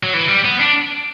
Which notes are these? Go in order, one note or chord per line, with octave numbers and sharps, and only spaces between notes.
F#3
E3
G3
B3
D4